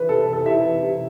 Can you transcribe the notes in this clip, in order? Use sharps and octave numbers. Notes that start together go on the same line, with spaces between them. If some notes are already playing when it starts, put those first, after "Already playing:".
Already playing: E3 B4
C3 A4
B4
E3
A4
C3 E4 E5
E3
C3